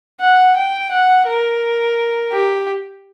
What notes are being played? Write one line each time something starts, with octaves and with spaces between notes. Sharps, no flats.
F#5
G5
F#5
A#4
G4